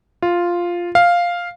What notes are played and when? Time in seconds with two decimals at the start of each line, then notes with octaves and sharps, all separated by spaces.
0.22 F4
0.95 F5